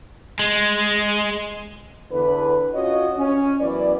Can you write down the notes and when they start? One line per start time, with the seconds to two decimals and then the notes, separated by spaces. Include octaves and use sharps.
0.39 G#3
2.11 E2 D3 B4
2.73 C#4 F4 F#4 C#5 D#5
3.16 C#4
3.60 F#2 E3 B3 D5